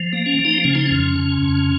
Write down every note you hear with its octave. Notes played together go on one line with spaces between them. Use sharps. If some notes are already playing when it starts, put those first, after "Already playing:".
Already playing: F3
A#3
C#4
F3
D#4
C#3 C#4
D#4
F2 C#4
C#3
F2